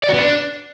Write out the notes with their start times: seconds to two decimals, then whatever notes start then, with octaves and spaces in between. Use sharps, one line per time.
0.03 D5
0.09 F#4
0.14 B3
0.19 D4